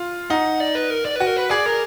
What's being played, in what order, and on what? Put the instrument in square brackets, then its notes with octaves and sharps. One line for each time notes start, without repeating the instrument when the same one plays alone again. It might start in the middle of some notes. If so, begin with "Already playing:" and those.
Already playing: [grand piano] F4
[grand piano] D#4 [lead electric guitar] F#5
[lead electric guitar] D5
B4
A#4
D5
[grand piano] F#4 [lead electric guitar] B4
[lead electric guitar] A#4
B4
[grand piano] G#4 [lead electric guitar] D5
[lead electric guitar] A#4